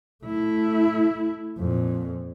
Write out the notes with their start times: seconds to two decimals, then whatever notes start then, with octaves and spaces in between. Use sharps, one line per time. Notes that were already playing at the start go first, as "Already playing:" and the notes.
0.25 A3 E4
1.59 F2 A#2